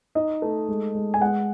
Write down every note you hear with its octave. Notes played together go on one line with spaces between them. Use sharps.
D#4 D#5
A3
G#3
G#3
G#5
G#3 F#5